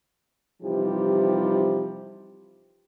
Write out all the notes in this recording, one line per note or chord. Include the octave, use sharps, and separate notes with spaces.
C3 E3 F3 G3 D#4 G4